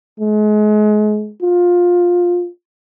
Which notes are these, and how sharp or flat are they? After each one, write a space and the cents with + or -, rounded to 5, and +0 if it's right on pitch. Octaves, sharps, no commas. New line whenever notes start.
G#3 +35
F4 +15